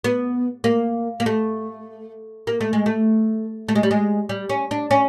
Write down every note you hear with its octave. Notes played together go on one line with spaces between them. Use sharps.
B3
A#3
A#3
A3
A#3
A3
G#3
A3
A3
G#3
G3
G#3
G3
C#4
D4
C#4